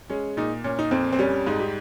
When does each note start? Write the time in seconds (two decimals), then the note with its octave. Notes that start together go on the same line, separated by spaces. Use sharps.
0.10 G#3 C#4
0.37 A#2 D#4
0.64 A#2 C#4
0.79 D#4
0.91 F2 C4
1.12 C4
1.19 G3 C#4
1.47 G#2 D#4
1.60 G4